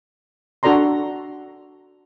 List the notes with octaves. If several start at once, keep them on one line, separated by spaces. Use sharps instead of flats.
D4 F#4 A4 D5 A#5 C6